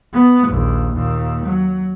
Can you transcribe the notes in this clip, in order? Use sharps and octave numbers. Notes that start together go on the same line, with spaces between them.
B3
A#1 D#2
D#2 A#2
F#3